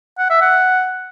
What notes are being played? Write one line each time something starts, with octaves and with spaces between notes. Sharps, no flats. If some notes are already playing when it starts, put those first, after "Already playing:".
F#5
E5
F#5